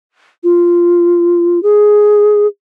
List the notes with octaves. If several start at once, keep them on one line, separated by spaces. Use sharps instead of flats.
F4
G#4